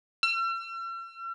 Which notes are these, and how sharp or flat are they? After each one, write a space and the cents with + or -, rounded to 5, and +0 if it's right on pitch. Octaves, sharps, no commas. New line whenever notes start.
E6 +45